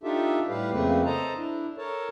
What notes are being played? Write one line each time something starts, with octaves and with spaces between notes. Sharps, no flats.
D4 D#4 F4 G4 A4 E5
A2 G3 G4 B4 F5
F2 C#3 A3 A#3 C4 B4
A4 C5 D#5 A5 A#5
D4 E4
A4 A#4 C#5 A5